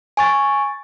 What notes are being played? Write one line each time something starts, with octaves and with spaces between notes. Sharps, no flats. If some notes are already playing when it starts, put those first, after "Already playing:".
G#5 C#6 A6